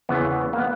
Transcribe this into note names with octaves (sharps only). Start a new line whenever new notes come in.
E2 C#3 E3 B3
B3
A#3
B3